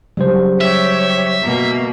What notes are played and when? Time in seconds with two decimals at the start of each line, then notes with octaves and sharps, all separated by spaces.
0.17 C#3 F#3 G3 C5
0.61 G4 C#5 E5
1.43 B2 A#3